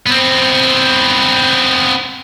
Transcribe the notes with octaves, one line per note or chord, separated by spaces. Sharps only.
B3 C4